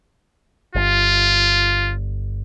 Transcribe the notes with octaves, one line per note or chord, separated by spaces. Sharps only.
G1 F4